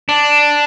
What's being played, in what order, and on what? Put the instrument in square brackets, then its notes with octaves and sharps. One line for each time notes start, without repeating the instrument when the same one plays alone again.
[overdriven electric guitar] D4